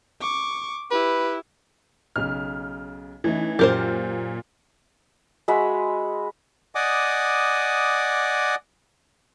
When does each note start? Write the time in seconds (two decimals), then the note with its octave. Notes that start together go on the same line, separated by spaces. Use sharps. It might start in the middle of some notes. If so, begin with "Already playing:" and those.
0.21 C#6 D6
0.91 E4 G4 B4
2.16 B1 C#3 F6
3.24 E3 A3 C#4 D#4
3.59 F#2 A#2 G4 A#4 C5
5.48 G#3 F#4 E5 B5
6.75 D5 D#5 F#5 G#5 D6 D#6